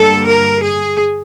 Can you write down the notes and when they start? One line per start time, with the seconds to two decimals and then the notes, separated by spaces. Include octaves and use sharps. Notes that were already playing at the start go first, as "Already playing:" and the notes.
Already playing: G2 D3 G3 A#3 A4
0.26 A#4
0.62 G#4